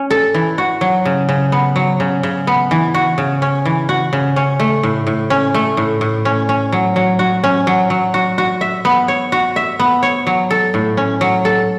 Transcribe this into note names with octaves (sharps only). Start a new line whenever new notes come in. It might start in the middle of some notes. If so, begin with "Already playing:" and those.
Already playing: C#4
A4
E3
F#4
F#3
C#3
C#3
B3
F#3
C#3
C#3
B3
E3
F#4
C#3
C#4
E3
F#4
C#3
C#4
A3
A2
A2
C#4
A3
A2
A2
C#4
C#4
F#3
F#3
F#4
C#4
F#3
F#3
F#4
F#4
E5
B3
C#5
F#4
E5
B3
C#5
F#3
A4
A2
C#4
F#3
A4